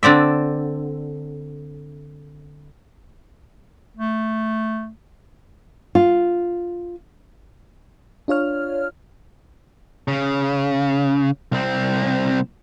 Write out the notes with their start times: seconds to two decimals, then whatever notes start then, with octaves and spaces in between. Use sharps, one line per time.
0.03 D3 C4 D5 E5
3.97 A3
5.95 F4
8.28 D4 F4 C#5 F6
10.08 C#3
11.52 C2 C4